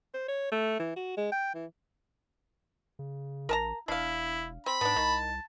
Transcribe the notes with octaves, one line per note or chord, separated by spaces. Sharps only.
C5
C#5
A3
E3
F#4
G#3
G5
E3
C#3
A1 A#4 A5 A#5
E1 D4 E4 F5
C4 B5
G#2 B3 D4 A5
C2 D#3